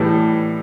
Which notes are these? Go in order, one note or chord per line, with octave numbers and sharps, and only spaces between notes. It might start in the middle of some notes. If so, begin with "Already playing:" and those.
Already playing: A2 E3 G3